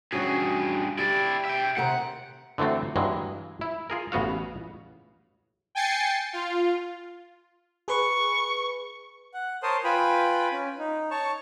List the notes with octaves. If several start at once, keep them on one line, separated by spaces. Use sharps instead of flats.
G2 E3 C#4 F#4 G#4
E4 G4 D5
E5 G5
D#2 C3 F#5 A#5
D3 E3 F#3 A3 C4
G2 E3 F#3 G#3 A#3
E4
F4 G#4 A#4
A1 C#3 B3 F#4 F5
G5 G#5 A6 C7 C#7
F4
G#4 B4 C#6
F#5
A#4 C5 C#5 A5 C6 D#6
F4 B4 G5 G#5 B5
C#4
D#4
C#5 A5 C#6